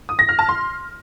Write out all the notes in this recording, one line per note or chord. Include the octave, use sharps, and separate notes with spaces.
D#6
A#6
F6
A5
C6